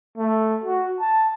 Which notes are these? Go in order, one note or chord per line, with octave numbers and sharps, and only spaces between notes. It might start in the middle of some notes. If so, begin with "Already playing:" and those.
A3
F#4
A5